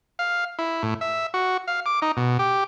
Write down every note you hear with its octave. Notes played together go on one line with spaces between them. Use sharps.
F5
E4
A2
E5
F#4
F5
D6
D#4
B2
G4